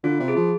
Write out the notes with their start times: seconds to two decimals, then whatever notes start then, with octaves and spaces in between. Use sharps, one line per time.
0.03 D3 F4
0.20 C3
0.28 G#4
0.35 F3